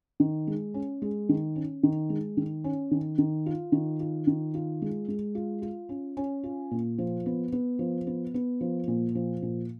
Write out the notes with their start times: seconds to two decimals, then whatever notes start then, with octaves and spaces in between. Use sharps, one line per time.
0.20 D#3
0.47 G#3
0.74 C#4
1.02 G#3
1.29 D#3
1.56 C#4
1.83 D#3
2.10 G#3
2.37 D#3
2.64 C#4
2.91 D#3
3.18 D#3
3.46 F4
3.72 D#3
4.00 F4
4.27 D#3
4.54 F4
4.82 G#3
5.08 G#3
5.35 F4
5.62 F4
5.89 C#4
6.17 C#4
6.44 F4
6.71 A#2
6.98 F3
7.26 B3
7.53 B3
7.79 F3
8.07 B3
8.34 B3
8.61 F3
8.88 A#2
9.15 F3
9.42 A#2